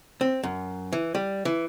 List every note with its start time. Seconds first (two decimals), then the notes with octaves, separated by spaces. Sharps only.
0.21 C4
0.43 F#2
0.93 E3
1.15 G3
1.45 E3